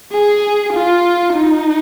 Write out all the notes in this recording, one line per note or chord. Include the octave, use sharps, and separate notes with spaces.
G#4
F4
D#4